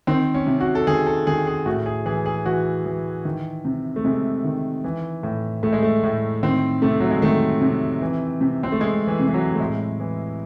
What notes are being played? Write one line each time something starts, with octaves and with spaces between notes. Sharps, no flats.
D#3 C4
C#4
C3
F#4
A4
D#3 G#4
A4
D#3 G#4
G#4
A2 F#4
G#4
E3 G#4
G#4
E3 F#4
E3
D#3
C3
A3
C3 G#3
D#3
E3
A2
A2 A3
G#3
A3
A2
D#3 C4
C3 A3
F#3
G#3
D#3 A3
C3
E3
C3
C4
A3
C3 G#3
E3
C3
E3
F#3
A3
A2 G#3
E3